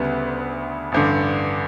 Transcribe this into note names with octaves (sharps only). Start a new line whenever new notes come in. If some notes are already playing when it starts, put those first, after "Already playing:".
Already playing: D2 C#3 G3 B3
A1 G2 D3